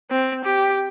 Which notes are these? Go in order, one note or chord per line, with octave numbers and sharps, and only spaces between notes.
C4
G4